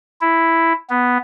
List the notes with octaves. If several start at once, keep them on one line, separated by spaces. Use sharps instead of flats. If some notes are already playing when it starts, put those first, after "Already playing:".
E4
B3